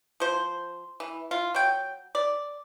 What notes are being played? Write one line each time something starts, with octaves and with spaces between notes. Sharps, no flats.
F3 C5
E3
F4
F#3 G5
D5